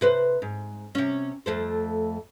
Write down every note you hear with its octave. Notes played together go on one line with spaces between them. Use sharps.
C3 B4 C5
G#2
C3 C#4
F2 A3 C5